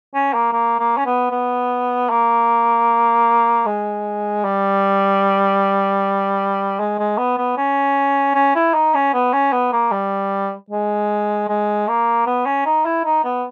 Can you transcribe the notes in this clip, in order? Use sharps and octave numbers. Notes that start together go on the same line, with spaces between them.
C#4
A#3
A#3
A#3
C#4
B3
B3
A#3
G#3
G3
G#3
G#3
B3
B3
C#4
C#4
E4
D#4
C#4
B3
C#4
B3
A#3
G3
G#3
G#3
A#3
B3
C#4
D#4
E4
D#4
B3